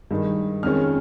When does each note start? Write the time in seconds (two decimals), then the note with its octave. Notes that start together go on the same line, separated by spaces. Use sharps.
0.11 G2 D#3 G#3 D#4
0.63 F2 D#3 G#3 C#4 F6